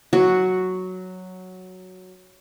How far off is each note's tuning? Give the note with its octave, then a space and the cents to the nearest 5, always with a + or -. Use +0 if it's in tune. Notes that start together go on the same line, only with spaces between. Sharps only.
F#3 +0 F#4 +0